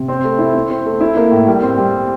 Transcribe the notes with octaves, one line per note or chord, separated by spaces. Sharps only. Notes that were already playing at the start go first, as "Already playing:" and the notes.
Already playing: C3
C4
A3
E4
C4
C4
A3
E4
A#3
A2
G3
C4
G3